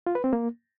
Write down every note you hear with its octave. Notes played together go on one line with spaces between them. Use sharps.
F4
B4
C4
A#3